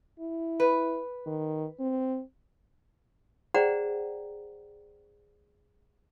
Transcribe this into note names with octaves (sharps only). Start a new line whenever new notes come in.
E4
B4
D#3
C4
G#4 C5 D5 F#5 G5 A#5